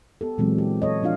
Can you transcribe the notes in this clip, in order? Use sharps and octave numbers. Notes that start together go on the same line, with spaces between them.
B3 G4 A4
A#2 E3 F#3 G#3 C4
G4
A4 C#5 D#5
F3 D4 F4 F5